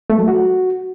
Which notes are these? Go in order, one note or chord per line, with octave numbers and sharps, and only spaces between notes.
A3
F#3
F#4